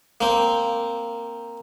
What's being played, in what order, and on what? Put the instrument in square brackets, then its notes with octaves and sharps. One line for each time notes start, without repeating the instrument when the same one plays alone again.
[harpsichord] A#3 C4